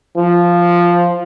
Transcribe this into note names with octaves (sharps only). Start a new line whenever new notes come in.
F3